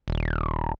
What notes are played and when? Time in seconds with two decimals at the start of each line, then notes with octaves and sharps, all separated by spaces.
0.08 D#1